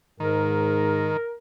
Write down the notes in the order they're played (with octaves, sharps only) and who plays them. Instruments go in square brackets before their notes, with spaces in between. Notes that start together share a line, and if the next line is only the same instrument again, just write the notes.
[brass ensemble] G#2 [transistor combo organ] D#3 [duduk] A#4